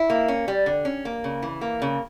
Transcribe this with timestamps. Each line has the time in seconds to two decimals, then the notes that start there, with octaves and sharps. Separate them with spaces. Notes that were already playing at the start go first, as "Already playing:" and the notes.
Already playing: E4
0.10 A#3
0.28 C#4
0.48 G3
0.66 D3
0.85 C#4
1.05 A#3
1.24 C#3
1.43 E3
1.61 A#3
1.82 C#3